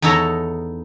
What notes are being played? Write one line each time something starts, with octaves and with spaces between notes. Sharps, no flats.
E2 D#4 E4 A4 C#5 A#5